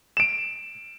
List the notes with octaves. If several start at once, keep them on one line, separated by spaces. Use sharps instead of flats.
D7 E7